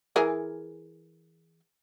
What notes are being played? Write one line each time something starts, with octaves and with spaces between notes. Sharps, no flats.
E3 G#4 A#4